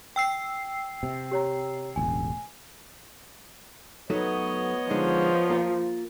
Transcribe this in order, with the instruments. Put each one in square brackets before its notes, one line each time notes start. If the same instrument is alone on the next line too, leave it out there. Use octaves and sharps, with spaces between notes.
[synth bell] G5 E6 C7
[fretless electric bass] C3
[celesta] G4 C#5 A#5
[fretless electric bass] E1 A1 D2 [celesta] G#5
[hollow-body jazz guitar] F#3 A3 D#4 [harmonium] B3 C#5 D#5
[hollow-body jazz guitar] D3 G#3 D#4 [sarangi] F3
[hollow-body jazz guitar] A#3 F4